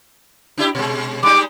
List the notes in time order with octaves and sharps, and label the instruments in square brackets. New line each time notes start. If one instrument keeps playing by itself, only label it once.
[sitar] D4 E4 G4
B2 G#3
[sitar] G3 G#3 D#4 [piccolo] D6